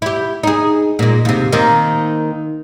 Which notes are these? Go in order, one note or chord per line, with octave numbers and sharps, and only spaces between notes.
E4 G4
D#4 G#4
A#2 G#3
D#2 C3
D#3 A#3 C4